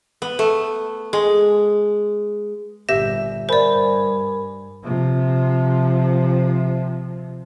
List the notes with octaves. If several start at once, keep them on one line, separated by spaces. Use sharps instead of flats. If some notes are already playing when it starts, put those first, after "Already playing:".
B3
A3
G#3
G1 A#2 G4 E5 G6 A#6
G2 A#4 C5 D5 G#5 B5
C3 F3